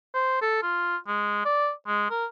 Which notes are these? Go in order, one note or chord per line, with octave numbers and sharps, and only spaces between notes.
C5
A4
F4
G#3
D5
G#3
A#4